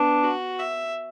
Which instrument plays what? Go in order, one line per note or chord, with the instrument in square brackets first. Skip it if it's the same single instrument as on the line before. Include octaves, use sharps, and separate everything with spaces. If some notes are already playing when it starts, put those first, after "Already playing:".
Already playing: [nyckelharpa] B3 [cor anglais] D4
[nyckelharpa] F#4
E5